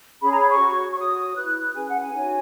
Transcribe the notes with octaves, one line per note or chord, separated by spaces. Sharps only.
C#4 G#4 C#5 B5
A#5
B5
C#6
F#4 C#5
C#6
F#4 C#5 D#6
E4 B4 F#6
C#4 G#4 B4 G#5
F#5
G#5
D#4 F#4 C#5